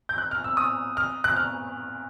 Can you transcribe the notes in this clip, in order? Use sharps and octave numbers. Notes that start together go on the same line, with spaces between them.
G6
F#6
F6
E6
D#6
F6
F#6
F6